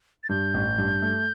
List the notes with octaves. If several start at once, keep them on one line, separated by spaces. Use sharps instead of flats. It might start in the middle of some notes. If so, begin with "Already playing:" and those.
A6
G2 G6
A1
G2
A3